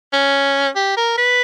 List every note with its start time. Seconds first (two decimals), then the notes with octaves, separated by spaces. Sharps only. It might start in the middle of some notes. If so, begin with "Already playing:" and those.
0.13 C#4
0.76 G4
0.97 A#4
1.17 B4